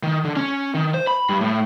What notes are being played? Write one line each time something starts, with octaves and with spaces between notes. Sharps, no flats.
D#3
D3
C#4
D#3
C5
B5
G2
A2